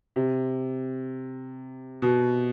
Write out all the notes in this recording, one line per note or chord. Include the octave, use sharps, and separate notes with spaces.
C3
B2